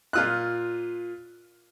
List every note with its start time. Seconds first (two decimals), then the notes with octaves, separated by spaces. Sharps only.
0.13 A#2 F4 F#6